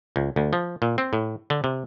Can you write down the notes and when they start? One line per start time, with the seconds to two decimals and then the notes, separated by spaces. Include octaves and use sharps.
0.16 C#2
0.36 D2
0.53 F3
0.82 A#2
0.98 C4
1.13 A2
1.50 D3
1.64 C3